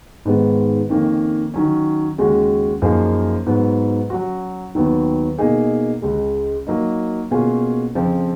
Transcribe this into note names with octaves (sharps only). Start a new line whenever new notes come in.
G#2 D#3 G#3 B3
F2 D#3 A#3 C#4
D#3 F#3 C#4
D#2 C#3 G#3 C#4 F#4
F#2 F3 A#3 D#4 G#4
G#2 F#3 B3
F#3 C#4 F#4
D#2 D#3 F#3 B3
B2 A#3 D#4 G#4
C#2 C#3 G#3
F#3 A#3 D#4
B2 A#3 C#4 F4 G#4
F2 C#3 F3